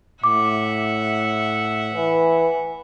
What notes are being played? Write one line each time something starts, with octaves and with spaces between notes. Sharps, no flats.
A2 E5 F#5 D6
E3